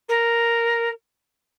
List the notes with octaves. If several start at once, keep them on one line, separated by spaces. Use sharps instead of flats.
A#4